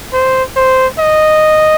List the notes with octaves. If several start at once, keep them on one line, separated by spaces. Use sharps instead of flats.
C5
C5
D#5